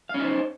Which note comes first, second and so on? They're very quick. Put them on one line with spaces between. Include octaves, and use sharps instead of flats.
F5 C#4 D#4 C5